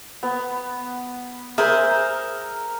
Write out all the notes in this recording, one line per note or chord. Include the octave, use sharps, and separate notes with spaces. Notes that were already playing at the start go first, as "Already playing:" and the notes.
B3
G#4 A#4 C5 E5